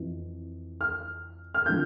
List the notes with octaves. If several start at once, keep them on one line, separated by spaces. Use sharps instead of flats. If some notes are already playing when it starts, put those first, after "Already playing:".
Already playing: F2 E3
F6
F6
D3 F3 G6